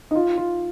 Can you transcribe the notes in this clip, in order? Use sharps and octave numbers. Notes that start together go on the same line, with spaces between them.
D#4
F4
F4